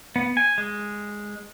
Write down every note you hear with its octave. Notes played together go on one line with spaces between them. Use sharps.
B3
G#5
G#3